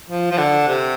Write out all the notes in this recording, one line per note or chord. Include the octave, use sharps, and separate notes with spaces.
F3
F3
D3
C3